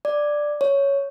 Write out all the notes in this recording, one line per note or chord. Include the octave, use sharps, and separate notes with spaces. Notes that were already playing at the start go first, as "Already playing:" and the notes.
D5
C#5